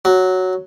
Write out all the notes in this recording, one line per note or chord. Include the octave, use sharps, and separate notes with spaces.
F#3